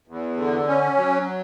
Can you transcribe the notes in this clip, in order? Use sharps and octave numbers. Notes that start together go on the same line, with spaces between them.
E2
D3
C#4
F#3